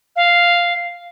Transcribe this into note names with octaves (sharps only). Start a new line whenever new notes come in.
F5